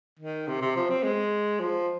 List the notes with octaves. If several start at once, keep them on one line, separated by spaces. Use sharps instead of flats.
D#3
C3
C3
F3
C4
G#3
F3